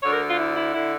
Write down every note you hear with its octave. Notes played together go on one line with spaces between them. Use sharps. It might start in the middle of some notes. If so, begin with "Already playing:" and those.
D2 D3 C#5
A#4
F4
E4
E4
D3 E4